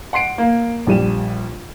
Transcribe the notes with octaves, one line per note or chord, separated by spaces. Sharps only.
F#5 C6 C7 D7
A#3
A#1 G3 D#7 E7